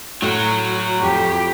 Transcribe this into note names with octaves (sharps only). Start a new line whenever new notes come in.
A2 F#3 F#4
F2 G4